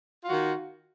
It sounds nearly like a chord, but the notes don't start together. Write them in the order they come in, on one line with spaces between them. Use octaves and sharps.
F4 F#4 D#3